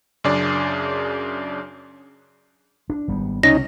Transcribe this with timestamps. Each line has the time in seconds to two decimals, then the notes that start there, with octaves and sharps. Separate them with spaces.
0.24 F#2 C#3 D4 G#4 D5
2.90 D4
3.08 G#1 G3 B3
3.43 C#2 C3 C#4 D#4 A#6